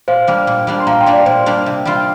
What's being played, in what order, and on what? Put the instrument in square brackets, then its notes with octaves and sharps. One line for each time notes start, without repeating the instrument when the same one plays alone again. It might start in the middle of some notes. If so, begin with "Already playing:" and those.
[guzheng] A#2 [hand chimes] C5 F5
[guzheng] G3 A#3 D4
A#2
G3 A#3 D4
[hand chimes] C6
[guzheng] A#2 [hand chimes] F5 A#5
[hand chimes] G5 C6
[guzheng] G3 A#3 D4
[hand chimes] D5 G5
[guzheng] A#2 [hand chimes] C5
[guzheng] G3 A#3 D4
C3
G3 C4 F4